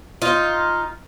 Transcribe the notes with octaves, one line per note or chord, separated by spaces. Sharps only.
D#4 F4